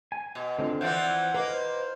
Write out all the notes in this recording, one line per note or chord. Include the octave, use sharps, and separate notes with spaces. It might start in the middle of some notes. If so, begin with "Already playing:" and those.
G#5
B2
D3 C4 F4
E3 F3 C4 C5 D5 F#5 G6
A#3 B4 D#5
C5